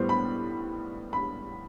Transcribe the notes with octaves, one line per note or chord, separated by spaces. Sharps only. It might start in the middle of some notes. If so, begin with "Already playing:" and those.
Already playing: A2 G3 B3 C5
B5
B5